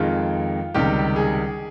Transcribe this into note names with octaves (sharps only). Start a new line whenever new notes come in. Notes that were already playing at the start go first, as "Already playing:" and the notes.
Already playing: F2 D#3 G#3 F4
C#2 C3 D#3 G3 G4
G#4